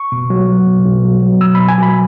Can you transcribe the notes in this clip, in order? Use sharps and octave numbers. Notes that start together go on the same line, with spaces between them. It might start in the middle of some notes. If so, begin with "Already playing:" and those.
Already playing: C#6
B2
F#3
F#3
B2
B2
F#3
F#3
B2 E6
B2 B5
G#5
F#3 B5